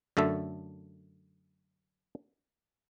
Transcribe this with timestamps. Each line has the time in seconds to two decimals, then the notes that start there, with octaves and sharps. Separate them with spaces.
0.17 F#2 D3 A3 A4 E5